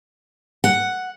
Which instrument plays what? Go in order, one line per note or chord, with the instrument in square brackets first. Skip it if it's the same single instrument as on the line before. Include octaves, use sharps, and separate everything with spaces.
[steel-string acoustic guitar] F#5